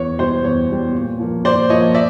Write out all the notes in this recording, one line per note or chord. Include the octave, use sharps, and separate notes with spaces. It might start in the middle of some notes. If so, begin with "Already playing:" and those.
Already playing: E2 C#5
B2 G3 C5
E2 C#5
B2 G3
A#2
F3 A#3
A#2 C5 D5
F3 A#3 C#5 D#5
D5 E5